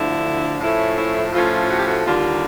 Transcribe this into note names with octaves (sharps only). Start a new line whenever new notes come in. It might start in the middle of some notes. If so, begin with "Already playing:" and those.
Already playing: D2 D3 F3 E4
A2 F3 A3 C#4 E4
E4
A2 F3 A3 C#4 F4
F#4
G4
F#4
D#2 D3 G3 A#3 F4